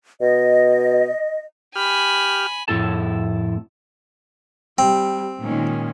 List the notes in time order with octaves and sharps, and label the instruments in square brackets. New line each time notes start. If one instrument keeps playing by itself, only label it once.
[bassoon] B2 [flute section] D#5
[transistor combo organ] G4 F6 [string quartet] G#5 B5
[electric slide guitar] F2 A2 E4 A4 A5
[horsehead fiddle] G3 [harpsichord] C4 [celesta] G5
[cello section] A#2 D#3 A#3 [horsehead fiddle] G#3 C#4